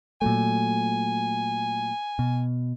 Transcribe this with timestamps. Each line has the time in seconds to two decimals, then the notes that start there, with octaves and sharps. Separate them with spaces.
0.22 A#2 F#3 A3 G#5
2.19 B2